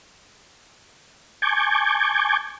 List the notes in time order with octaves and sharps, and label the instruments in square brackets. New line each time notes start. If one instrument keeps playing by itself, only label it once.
[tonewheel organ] G#5 A5 C#6 D6 G6 G#6